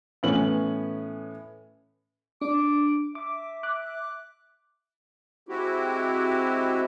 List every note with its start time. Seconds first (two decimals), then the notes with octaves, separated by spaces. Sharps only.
0.23 A2 E3 B3 C#4 F#7
2.41 D4 D6
3.15 E5 D6
3.63 D6 F#6
5.49 G#3 C4 E4 F#4 G4